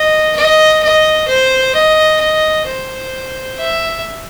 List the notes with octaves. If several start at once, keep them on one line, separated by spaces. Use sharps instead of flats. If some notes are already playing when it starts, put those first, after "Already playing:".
Already playing: D#5
D#5
D#5
C5
D#5
D#5
C5
E5